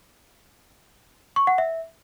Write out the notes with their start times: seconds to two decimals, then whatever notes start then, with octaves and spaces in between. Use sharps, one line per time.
1.36 C#6
1.47 F#5
1.58 E5